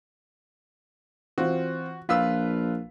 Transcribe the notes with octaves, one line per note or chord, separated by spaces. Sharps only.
E3 C4 F4 F#4
A#1 F4 B4 E6 B6